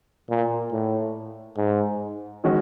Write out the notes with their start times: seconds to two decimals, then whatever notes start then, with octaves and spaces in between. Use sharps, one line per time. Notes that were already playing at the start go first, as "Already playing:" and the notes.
0.30 A#2
0.72 A2
1.57 G#2
2.44 D#3 G#3 C#4 F#4